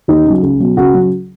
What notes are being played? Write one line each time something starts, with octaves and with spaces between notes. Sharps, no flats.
D#2 D#4
C#3
F#3
C#2
B2 F#3
C#2 F#4
C#3 F#3